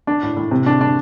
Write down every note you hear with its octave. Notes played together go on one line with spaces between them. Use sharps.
D4
A2
A2
C3
D4
D4